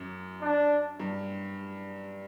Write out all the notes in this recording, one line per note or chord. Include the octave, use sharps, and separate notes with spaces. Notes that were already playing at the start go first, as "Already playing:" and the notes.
Already playing: F#2
D4
G2